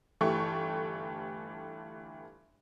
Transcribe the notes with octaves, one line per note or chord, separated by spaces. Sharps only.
G1 E3 A3 G4 A4 C#6